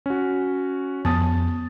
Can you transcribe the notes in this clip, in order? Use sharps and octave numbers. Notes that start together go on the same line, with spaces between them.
C#4 F#4
F2 B3 A5 D#6 A6